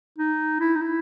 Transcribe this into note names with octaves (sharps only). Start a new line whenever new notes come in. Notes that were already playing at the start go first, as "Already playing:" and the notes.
D#4
E4
D#4
E4